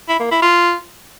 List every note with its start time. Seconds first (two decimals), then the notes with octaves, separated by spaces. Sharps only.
0.09 E4
0.20 A#3
0.31 E4
0.42 F4